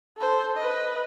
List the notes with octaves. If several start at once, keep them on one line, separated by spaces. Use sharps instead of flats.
A4 C5
B4 D#5